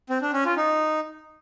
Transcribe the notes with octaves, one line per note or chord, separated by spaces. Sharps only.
C4
D4
C#4
F4
D#4